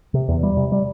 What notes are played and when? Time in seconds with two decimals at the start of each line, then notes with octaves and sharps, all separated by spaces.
0.14 C3
0.28 E2
0.43 G3
0.57 C3
0.72 G3